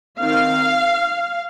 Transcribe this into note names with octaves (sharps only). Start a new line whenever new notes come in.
D#3 C4 F5